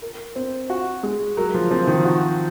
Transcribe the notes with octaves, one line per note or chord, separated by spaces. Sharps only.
A#4
C4
F#4
G#3
F#3 A#4
F3
F3 C4
D#3
F#4